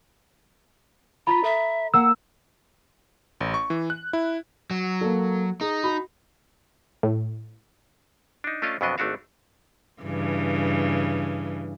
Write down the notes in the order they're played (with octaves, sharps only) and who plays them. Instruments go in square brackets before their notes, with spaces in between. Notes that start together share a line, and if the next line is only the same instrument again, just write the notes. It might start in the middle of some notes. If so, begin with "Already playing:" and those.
[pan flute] F4 [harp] A#5 A6 B6 [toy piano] B5
[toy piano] A4 [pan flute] E5
[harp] A#3 [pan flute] F#5 [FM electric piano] E6
[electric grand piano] A1
C#6
E3
F#6
E4
[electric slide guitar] F#3
[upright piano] A#3 A4
[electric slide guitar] D#4 [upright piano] G#4
[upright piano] F#4 B5
[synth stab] A2
[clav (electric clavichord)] D4 D#4
A3 C#4 D4 F4 D#5 F5
F2 B2 F#3 B3 D4 D#5
G#1 A3 D4 F#4 F5
[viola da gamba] G2 C#3 E3